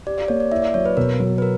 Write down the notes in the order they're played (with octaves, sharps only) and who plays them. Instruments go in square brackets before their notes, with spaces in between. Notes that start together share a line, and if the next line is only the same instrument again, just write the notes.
[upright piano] G4 [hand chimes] D5
[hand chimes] D5
[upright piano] A#3 [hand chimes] C#5
[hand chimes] D5
[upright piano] E4 [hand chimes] E5
[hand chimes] D5
[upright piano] F#3 [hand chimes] C#5
[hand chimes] B4
[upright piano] B2 [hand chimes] A#4
[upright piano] F#3
[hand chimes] B4
A#4